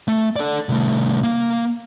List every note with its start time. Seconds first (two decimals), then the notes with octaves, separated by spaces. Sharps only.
0.08 A3
0.36 A4 D5
0.69 C2 A3
1.23 A#3